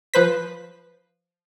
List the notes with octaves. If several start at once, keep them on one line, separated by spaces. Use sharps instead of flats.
F3 B4 C5 B6